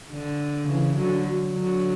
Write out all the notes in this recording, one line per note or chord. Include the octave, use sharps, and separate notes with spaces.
D3
C#3 E3
D3 F#3
D3 F#3